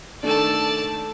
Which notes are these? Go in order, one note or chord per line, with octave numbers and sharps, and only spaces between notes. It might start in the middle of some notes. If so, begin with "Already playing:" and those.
D#3 A3 D4 A4 D5 A5